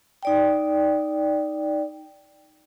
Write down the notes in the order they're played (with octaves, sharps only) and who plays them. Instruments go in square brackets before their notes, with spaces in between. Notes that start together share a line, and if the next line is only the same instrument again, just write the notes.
[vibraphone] D#4 D5 G5